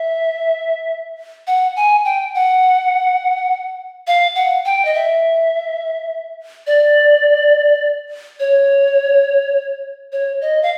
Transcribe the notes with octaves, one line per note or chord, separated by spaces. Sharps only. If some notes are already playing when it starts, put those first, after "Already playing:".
Already playing: E5
F#5
G#5
G5
F#5
F5
F#5
G5
D#5
E5
D5
C#5
C#5
D#5
F5